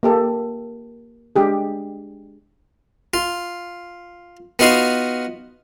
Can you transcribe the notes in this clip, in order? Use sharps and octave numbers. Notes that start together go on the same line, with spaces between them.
A#3 G4 A4
G#3 D4 G4 G#4
F4
B3 D#4 F4 F#4 F5